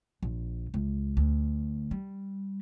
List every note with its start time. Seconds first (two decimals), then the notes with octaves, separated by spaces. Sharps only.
0.23 A#1
0.74 C#2
1.17 D2
1.91 G3